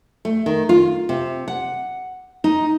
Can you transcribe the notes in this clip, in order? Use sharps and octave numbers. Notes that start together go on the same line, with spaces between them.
A3
D#3
F4
C3
F#5
D#4